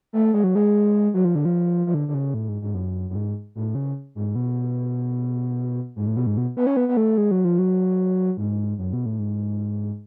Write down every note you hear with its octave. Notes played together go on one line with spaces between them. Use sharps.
A3
G#3
F#3
G#3
F#3
F3
D3
F3
F3
D3
D3
C#3
A2
G#2
G#2
F#2
F#2
G#2
A2
C#3
G#2
B2
G#2
A2
B2
G#2
B2
B3
C#4
B3
B3
A3
G#3
F#3
F3
F#3
G#2
F#2
B2
A2
G#2